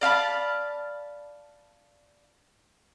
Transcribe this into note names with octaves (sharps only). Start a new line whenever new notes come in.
D5 F5 A5 B5